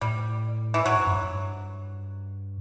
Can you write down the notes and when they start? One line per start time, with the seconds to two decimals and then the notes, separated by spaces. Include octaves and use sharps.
0.01 A2 G3
0.74 E3
0.86 A2 F#3
0.96 G2
1.07 F#2
1.16 G2